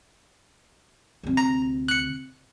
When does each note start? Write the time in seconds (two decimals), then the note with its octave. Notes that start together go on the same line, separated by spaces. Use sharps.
1.23 D2 C3
1.37 A#5
1.88 F#6 C#7